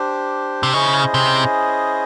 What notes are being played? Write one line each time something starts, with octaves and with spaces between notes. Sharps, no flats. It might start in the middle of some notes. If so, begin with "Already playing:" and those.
Already playing: D4 G4 C5
C3
C#3 C#4 E4 G#4 C5 D#5
C3